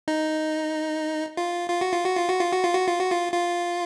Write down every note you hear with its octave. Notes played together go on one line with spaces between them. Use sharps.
D#4
F4
F4
F#4
F4
F#4
F4
F#4
F4
F#4
F4
F#4
F4
F#4
F4
F4